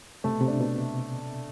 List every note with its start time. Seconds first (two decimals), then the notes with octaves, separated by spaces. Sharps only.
0.24 C3 A3
0.33 B2
0.41 C3
0.48 D4
0.60 B2